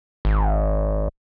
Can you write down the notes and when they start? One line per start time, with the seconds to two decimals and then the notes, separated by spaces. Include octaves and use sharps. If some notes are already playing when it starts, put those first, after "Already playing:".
0.25 G#1